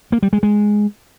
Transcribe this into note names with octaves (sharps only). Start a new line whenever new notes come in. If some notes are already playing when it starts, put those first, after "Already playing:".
A#3
G3
G#3
G#3